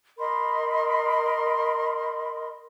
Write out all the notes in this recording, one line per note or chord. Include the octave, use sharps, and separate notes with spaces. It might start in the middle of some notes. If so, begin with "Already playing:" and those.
A#4 D#5 B5 C6